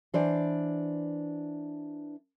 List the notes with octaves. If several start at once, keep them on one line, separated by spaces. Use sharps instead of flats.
E3 D4 C5 D5